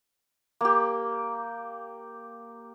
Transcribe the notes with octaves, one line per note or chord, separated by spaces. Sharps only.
A#3 G4